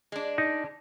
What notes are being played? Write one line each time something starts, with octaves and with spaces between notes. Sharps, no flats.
G#3 D4
D#4